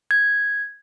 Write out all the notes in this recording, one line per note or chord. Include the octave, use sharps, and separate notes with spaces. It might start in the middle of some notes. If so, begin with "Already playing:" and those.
G#6